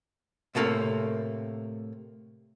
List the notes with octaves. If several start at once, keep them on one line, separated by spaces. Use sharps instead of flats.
A2 C3 A3 A#3